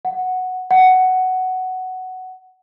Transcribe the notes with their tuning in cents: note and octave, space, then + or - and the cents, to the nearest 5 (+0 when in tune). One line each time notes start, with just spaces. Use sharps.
F#5 +0
F#5 +10